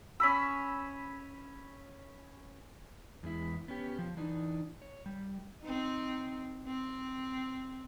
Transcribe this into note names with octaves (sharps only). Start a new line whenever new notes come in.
C#4 B5 E6
E2 G#3 E4
B3 C#4 G4
F3
E3 D4 D#4
C#5
G3
C4 D#4
C4